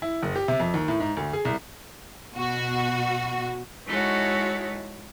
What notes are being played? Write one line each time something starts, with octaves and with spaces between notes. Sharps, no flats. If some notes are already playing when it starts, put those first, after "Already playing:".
E4
F#1
G4
C3
F2
D#2
A2
G#2
D2
G#4
C2
B2 F#4
G#3 D#4 E4 F#4 A4 C#5